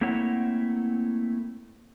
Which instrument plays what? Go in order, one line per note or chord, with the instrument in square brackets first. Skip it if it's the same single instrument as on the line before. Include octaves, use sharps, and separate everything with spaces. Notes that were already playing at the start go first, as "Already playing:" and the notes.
[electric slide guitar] A3 A#3 C4 E4 C#5 F#5